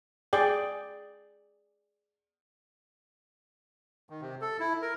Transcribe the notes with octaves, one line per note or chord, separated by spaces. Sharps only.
G#4 D5 G5
D#3
C3
A4
E4
A#4